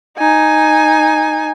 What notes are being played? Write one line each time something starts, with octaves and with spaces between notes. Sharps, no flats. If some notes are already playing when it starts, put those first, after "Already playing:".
D#4 G#5